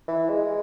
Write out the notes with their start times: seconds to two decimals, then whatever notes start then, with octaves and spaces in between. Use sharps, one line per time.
0.08 E3
0.29 G#3